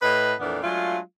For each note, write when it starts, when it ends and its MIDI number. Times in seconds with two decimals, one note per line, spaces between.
0.02 0.33 45
0.02 0.33 71
0.02 0.33 75
0.39 0.61 41
0.39 0.61 46
0.39 0.61 52
0.39 0.61 59
0.39 0.61 62
0.39 0.61 70
0.62 0.98 54
0.62 0.98 56
0.62 0.98 57
0.62 0.98 62
0.62 0.98 65